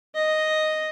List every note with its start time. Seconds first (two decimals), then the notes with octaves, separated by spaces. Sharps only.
0.15 D#5